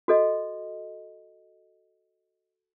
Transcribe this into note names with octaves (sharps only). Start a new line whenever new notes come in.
F#4 A4 D#5